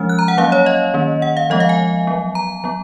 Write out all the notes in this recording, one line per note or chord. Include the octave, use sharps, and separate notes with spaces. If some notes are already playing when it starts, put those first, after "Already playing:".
Already playing: F3 G#3 C#4 F6
F#6
A#5
F#5
F#3 A#3 C#4 F5
C#5
D#5
D#3 A#3 C#4
F#5
F5
F3 G#3 B3 D#5
F5
G#5
F#3 B3
A#5
F#3 B3